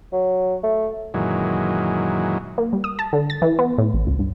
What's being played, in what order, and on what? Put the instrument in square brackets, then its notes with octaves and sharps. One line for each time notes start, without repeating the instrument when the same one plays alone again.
[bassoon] F#3
A3
[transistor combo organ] F#2 A#2 D#3 E3 F#3 G#3
[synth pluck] A#3
G3
D#6
A5
D3
A6
E3
B3
A2
A1
C#2
G2